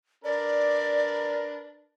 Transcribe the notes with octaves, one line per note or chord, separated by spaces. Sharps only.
D4 A#4 B4 D5